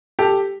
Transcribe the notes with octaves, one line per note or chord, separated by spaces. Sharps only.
G4 A4